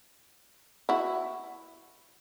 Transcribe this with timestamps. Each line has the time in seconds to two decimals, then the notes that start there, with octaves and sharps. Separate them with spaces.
0.89 E4 F#4